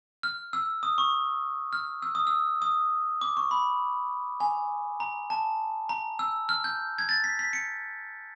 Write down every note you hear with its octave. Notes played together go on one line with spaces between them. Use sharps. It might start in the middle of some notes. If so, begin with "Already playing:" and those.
F6
E6
D#6
C#6
F6
E6
D#6
E6
D#6
D6
C#6
B5
G#5
A#5
A5
A#5
E6
F6
G6
G#6
A6
B6
B6
C#7